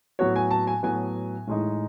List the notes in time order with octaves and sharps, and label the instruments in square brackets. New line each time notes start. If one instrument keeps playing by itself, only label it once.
[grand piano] A2 F#3 B3 F#4 [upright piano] C#5
[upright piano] G#5
A5
G#5
[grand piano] A2 F#3 B3 F#4 [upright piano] G#5
[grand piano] A2 E3 G#3 D#4